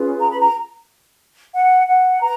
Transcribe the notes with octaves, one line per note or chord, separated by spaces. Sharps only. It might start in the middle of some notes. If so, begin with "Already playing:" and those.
Already playing: C#4 F4 G#4 B4
A#5
B5
A#5
F#5
F#5
B4 A#5